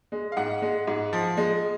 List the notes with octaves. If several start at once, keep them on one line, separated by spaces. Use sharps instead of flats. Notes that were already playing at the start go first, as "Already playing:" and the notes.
G#3
F5
G#2 F#5
G#3
G#2
F3
G#3